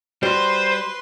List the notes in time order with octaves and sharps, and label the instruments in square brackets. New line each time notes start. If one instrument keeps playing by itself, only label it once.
[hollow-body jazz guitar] G3 F#4 [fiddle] B4 C6 [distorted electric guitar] C5